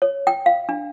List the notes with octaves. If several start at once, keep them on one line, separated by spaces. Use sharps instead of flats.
C#5
G5
F5
D4